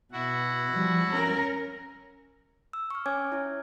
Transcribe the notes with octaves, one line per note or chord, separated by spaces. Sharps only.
B2 E4 F#4 F#5
F3 G3
C#4 A#4
E6
C#6 F6
C#4 C#5 G#5 D6 F6 G#6
E4 C#5